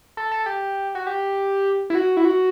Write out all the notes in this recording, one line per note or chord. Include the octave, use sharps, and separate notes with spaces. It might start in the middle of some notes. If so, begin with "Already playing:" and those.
A4
A4
G4
F#4
G4
E4
F#4
E4
F#4